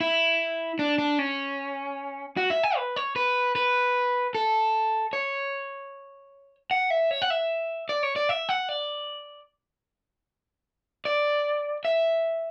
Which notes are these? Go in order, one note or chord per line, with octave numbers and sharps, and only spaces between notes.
E4
D4
D4
C#4
F#4
E5
G#5
B4
C#5
B4
B4
A4
C#5
F#5
E5
C#5
F#5
E5
D5
C#5
D5
E5
F#5
D5
D5
E5